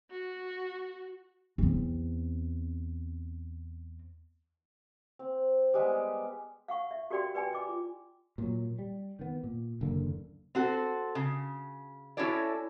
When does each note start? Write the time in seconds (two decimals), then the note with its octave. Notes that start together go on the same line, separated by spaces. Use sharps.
0.10 F#4
1.58 E2 C4
5.19 C4
5.74 G3 G#3 B3
6.68 F5 F#5 C#6
6.91 E5
7.10 F#4 G4 A#4 D5 G5 C6
7.35 B4 D5 G5 G#5 B5
7.53 D#5 D6
7.68 F4
8.38 A#2 F#3
8.79 G3
9.19 D#3 B3
9.44 A#2
9.81 F#1 D#2 D3 A#3
10.55 C4 F#4 A4
11.15 C#3
12.17 C#4 E4 F#4 A4 C#5 D5